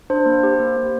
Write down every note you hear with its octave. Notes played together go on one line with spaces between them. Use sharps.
D4 C5
A#3
G4
A#3
A#3